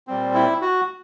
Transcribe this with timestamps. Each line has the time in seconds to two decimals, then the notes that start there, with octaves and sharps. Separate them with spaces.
0.07 A#2 G3 C4
0.34 E4
0.62 F#4